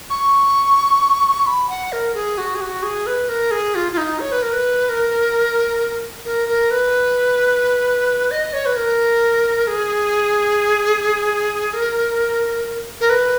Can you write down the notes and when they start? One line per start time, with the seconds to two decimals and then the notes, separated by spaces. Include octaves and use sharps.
0.10 C#6
1.47 B5
1.69 F#5
1.92 A#4
2.14 G#4
2.38 F#4
2.55 G#4
2.61 F#4
2.83 G#4
3.07 B4
3.29 A#4
3.51 G#4
3.75 F4
3.92 F4
3.97 D#4
4.20 C#5
4.32 B4
4.42 A#4
4.53 B4
4.89 A#4
6.25 A#4
6.49 A#4
6.71 B4
8.31 D#5
8.53 C#5
8.66 B4
8.76 A#4
9.67 G#4
11.73 A#4
13.01 A#4
13.10 B4